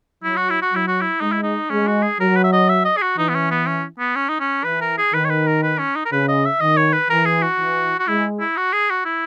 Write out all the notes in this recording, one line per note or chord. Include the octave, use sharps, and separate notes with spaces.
F#3 E4
F#4
E4
F#4
F#3 E4
F#4
E4
G#3 D#4
E4
D#4
G#3 C#4
F#4
G#4
F#3 A#4
B4
E5
D#5
E5
D#5
G#4
F#4
E3 D#4
B3
C#4
B3
C#4
B3
C#4
D#4
C#4
E3 B4
A#4
G#4
D#3 B4
C#5
B4
A#4
B4
C#4
D#4
A#4
C#3 B4
D#5
E5
D#3 D#5
C#5
B4
E3 A#4
G#4
F#4
E3
F#4
G#3 E4
E4
F#4
G#4
F#4
E4